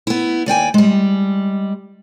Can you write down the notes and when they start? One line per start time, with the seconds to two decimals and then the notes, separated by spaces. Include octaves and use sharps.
0.07 B3 E4
0.46 D#2 D5 G5 G#5
0.74 G3 G#3